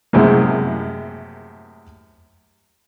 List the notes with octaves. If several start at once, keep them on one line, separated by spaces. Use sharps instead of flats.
F#2 A2 C3 G#3 A#3